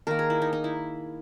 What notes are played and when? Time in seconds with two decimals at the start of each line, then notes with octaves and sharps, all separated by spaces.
0.07 D#3 A#3 A#4
0.19 G#4
0.30 E4
0.42 D#4
0.53 D#4
0.64 E4